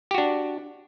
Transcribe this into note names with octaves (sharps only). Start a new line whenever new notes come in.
D4 F#4 G4